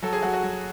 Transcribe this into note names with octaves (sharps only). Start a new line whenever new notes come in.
F#3 A4
G#4
F#3 F#4
F#4
F#3